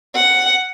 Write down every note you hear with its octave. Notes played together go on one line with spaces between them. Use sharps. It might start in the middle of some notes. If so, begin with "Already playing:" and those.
F#5